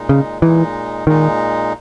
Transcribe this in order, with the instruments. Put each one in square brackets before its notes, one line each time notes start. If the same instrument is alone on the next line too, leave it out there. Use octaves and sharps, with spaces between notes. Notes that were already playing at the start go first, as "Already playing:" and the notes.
Already playing: [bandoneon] A#2 G#3 D#4
[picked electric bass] C#3
[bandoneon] A#2 G#3 D#4 [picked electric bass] E3
[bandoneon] A#2 G#3 D#4 [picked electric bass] D#3